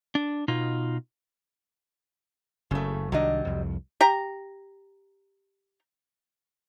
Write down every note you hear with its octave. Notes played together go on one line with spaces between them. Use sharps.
D4
B2 D#4 F4
F#1 C#3 A3
C2 D#3 F#3 G3 D4 D#5
C2 F2
G4 A#5